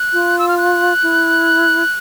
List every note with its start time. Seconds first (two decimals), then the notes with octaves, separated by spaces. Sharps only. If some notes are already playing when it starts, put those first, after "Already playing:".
Already playing: F#6
0.13 F4
0.39 E6
0.48 F6
0.58 F#6
1.03 E4